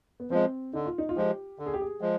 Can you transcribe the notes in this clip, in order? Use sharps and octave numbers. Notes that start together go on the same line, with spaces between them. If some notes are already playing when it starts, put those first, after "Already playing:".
B3
F3 G#3 C4
D3 D#4
F4
D#4
F4
F3 G#3 G4
D3
G#4
G4
G#4
F3 G#3